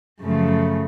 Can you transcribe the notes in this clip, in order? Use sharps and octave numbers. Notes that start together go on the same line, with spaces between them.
F#2 C#3 F3 A3